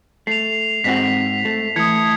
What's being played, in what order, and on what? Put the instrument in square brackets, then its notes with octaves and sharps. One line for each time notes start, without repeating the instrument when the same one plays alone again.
[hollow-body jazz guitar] A3 [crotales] C7 F7
[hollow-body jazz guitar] G#2 C4 F#4 [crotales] B6
[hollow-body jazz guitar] A3
[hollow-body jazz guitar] E3 [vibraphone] A3 D#6 [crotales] G#6 C#7